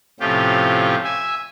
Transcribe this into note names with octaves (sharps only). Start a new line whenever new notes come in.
A2 C3 F3 C#4 F4 G4
E5 G#5